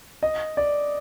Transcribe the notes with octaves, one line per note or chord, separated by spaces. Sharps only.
D#5
D5